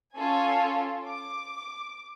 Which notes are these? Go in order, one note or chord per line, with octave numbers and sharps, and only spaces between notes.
C#4 F4 A4 G#5
D6